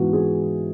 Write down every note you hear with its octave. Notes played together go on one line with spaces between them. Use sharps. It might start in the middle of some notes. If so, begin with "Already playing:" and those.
Already playing: G#2 E3 B3 F#4
G#4